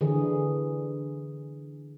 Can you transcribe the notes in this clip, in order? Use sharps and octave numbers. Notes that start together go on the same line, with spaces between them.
D3 E3 G#4